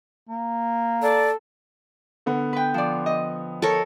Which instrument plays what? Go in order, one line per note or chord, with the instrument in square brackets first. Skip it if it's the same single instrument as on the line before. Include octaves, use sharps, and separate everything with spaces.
[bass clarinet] A#3
[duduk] A4 [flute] D5
[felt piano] D3 B3 F#5
[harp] B4 G5
F3 D5
D#5
[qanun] A4 A#4 C#5